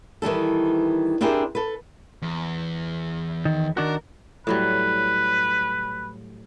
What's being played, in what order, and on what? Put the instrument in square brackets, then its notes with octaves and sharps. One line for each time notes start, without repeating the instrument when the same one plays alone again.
[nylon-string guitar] D#3 E3 G3 A4
C4 D4 E4 G4 G#4 A#4
A4 B4
[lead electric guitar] E2
[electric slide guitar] D#3
[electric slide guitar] D#3 D4 F#4 [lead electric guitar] A#4
[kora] A2 F#3 G3 [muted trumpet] B4